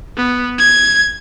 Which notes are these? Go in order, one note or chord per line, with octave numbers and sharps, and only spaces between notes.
B3
G#6